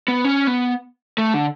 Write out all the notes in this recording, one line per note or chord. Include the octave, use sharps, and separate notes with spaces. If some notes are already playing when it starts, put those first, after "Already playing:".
B3
C#4
B3
A3
D3